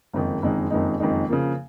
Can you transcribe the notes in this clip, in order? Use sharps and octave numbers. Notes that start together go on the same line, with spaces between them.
F#1 F2 D#3 G#3 D#4
F#1 F2 D#3 G#3 D#4
F#1 F2 D#3 G#3 D#4
F#1 F2 D#3 G#3 D#4
C#3 F3 A#3